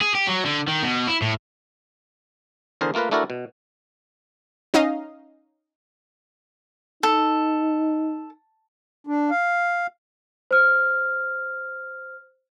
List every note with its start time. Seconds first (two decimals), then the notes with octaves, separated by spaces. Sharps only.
0.01 G#4
0.15 G4
0.27 F#3
0.46 D3
0.68 D#3
0.83 B2
1.08 E4
1.22 A2
2.81 E2 D3 G#4 A#4 C5
2.94 A3 A#3 F4 A#4 B4
3.11 A3 D4 E4 F#4 A4 A#4
3.30 B2
4.74 C#4 D#4 D#5 F5
7.03 D#4 A4
9.07 D4
9.30 F5
10.51 C5 F6